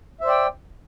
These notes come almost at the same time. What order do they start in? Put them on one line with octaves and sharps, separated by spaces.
E5 C5 D5 G5